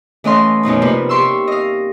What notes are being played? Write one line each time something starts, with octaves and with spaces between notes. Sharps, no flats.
E3 A3 C#4 D#5 F5 C6
F#2 B2 F3 D#4
C3 F3 G3 A#3 F4 B4
G4 E5 C6 C#6 E6
D#5 F5